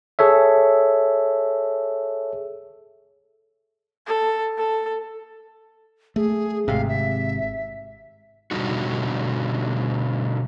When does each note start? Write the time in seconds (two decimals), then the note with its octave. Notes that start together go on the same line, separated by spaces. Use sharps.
0.19 G#4 A4 C#5 E5
4.06 A4
4.58 A4
6.16 A3 G#4
6.68 G#1 G#2 C3 F5
6.88 E5
8.51 B2 D3 G3 C4 D#4 F#4